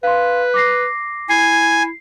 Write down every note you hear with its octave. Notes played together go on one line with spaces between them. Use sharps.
B4 F5 C6
D6 A#6 C7
E4 G#5 C7